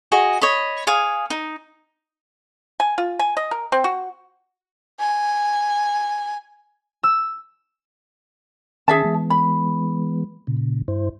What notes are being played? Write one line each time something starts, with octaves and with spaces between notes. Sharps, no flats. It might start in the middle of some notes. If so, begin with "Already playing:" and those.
F#4 G#4 D#5
C#5 D#5 B5
G#4 C#5 F5 D#6
D#4
G#5
F4
G#5
D#5
A#4
C4
F#4
G#5
E6
D#3 C#4 G#4 E5 A5
E3 G#3 B3
B5
A#2 C#3
G2 E4 C5